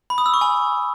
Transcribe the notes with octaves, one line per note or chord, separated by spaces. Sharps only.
B5
D#6
E6
C#6
G#5